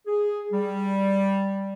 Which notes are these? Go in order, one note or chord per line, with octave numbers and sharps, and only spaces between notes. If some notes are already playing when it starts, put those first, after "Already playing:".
G#4
G3